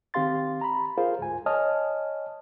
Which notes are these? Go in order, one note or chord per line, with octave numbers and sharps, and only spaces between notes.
D#3 C4 G4 F5 C6 A6
A#5 B5
F4 G#4 A#4 C5 F5
D2 G#2 G#5
C#5 D#5 G#5 A5 D#6 F6